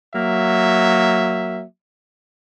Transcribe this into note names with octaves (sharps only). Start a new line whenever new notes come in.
F#3 A#3 E5